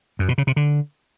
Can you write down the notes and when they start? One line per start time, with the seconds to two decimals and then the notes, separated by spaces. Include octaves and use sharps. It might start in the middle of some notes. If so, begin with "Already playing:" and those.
0.19 F#2
0.29 B2
0.38 C#3
0.47 C3
0.56 D3